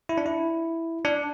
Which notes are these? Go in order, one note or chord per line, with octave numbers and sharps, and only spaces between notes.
E4
D4
E4
D4